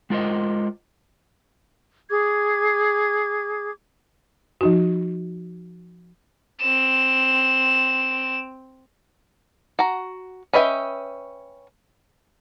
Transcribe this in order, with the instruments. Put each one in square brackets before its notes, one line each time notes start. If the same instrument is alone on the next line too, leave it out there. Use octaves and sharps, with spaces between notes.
[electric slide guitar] G#3 F4 A#4 C5 D#5
[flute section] G#4 D6 G#6
[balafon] F3 D#4 F#4
[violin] C4 E7
[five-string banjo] F#4 A#5
C#4 B4 D#5 E5 G5